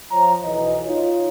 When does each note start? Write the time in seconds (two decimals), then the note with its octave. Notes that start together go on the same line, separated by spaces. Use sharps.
0.12 F3 C#5 A#5
0.43 B1 E3 D#5
0.86 D#4 F4 C#5